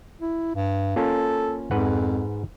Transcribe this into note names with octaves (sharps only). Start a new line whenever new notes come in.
E4
G2
A#3 C#4 F4 A4
F2 G#2 B4 F#5